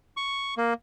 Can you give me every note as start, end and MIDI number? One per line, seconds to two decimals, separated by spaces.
0.17 0.54 85
0.57 0.74 58